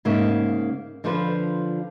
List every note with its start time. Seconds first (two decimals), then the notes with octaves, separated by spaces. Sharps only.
0.05 G#2 C#3 A#3 E5
1.04 D3 F3 D4 F4 B4